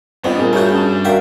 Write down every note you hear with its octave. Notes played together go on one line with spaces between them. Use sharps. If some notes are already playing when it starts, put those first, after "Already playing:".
G2 G3 B3 C4 F4 D#5
A#2 G#4 A#4
A3 F#4 G#4 A#4 C#5 G6
C#4 G#4 A5
F#4 A#4 D5 E5 F5 G5